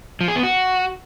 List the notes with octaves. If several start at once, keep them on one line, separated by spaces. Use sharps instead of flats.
F3
G#4
B3
F#4